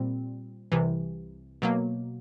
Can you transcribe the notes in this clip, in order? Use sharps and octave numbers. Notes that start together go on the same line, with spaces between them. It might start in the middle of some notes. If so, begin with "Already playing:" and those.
Already playing: A#2 G3 C4
C2 C3 E3
B2 F#3 A#3